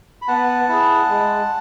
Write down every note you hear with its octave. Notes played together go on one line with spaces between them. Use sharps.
B5
B3 F#5 A5
E4 G#4
G#3